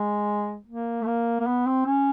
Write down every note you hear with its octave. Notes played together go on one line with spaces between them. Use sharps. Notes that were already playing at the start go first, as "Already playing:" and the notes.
Already playing: G#3
A#3
A3
A#3
A#3
B3
C4
C#4